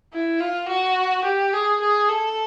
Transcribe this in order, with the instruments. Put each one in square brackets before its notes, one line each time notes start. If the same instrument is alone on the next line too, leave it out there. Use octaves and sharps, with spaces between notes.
[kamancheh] E4
F4
F#4
G4
G#4
G#4
A4